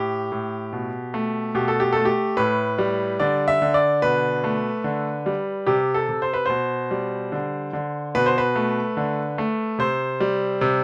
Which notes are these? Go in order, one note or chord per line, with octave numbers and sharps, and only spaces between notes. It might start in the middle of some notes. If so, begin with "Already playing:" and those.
Already playing: A2 G4
A2
B2
A3
B2 G4
A4
G4
A3 A4
G4
A2 B4
G3
D3 D5
E5
D3
D5
B2 B4
A3
D3
G3
C3 G4
A4
C3
C5
B4
B2 C5
G3
D3
D3
B2 B4
C5
B4
A3
D3
A3
C3 C5
G3
C3